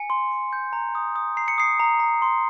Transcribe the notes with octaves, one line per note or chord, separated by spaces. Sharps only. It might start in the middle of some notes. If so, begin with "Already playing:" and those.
Already playing: G#5 C#7
C6
C6
G6
A#5
D#6
D#6
A#5 C7
C#7
D#6 C7
A#5
A#5
C6